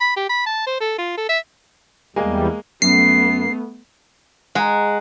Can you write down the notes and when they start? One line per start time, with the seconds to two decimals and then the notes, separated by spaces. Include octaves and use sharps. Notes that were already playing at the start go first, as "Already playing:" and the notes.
0.01 B5
0.17 G4
0.30 B5
0.46 A5
0.67 C5
0.80 A4
0.99 F4
1.17 A4
1.29 E5
2.16 E2 G3 G#3 A#3 G#5
2.82 F#2 A3 B3 C7
4.55 G#3 F#5 A#5